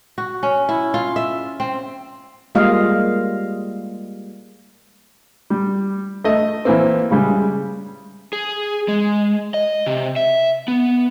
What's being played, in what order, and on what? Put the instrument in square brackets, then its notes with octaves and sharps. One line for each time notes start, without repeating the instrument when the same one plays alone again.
[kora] F#4
C#4
E4
F4
E5
C4
[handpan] G3 G#3 A#3 F4 D#5 F5
[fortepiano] G3
A3 D#5
E3 A#3 C4
C#3 G3 G#3
[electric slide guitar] G#4
G#3
D#5
C3
E5
B3